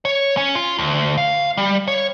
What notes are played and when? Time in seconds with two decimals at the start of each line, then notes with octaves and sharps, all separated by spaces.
0.05 C#5
0.37 C#4
0.55 F4
0.78 D2
1.17 F5
1.57 G3
1.88 C#5